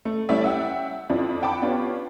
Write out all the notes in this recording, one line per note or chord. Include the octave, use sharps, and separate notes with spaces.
A3
G3 A3 C#4 E4 D5 E5
E5 F#5 G5 E6
F2 F3 D4 E4
F#5 G5 A5 B5 D6
B3 D4 F4 G4 C#5